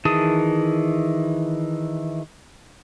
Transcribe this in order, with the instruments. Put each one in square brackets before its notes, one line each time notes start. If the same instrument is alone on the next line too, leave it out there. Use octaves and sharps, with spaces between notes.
[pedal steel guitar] D#3 E3 G#4 A5 D#6